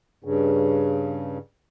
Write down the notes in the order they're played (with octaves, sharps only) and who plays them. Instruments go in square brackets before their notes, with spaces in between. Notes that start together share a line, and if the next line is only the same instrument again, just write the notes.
[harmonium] G2 C#3